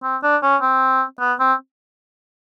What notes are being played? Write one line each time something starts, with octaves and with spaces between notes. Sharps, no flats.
C4
D4
C#4
C4
B3
C4